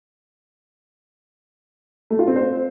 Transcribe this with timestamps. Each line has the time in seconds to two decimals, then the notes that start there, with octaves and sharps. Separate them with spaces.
2.10 A3
2.19 F4
2.27 C4
2.36 C5